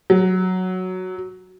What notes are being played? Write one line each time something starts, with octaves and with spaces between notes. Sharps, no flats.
F#3